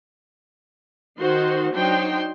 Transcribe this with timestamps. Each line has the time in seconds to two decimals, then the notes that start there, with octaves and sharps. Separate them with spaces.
1.19 D#3 D#4 F#4 C5 C6
1.74 F#3 D4 D#4 C5 G5 C6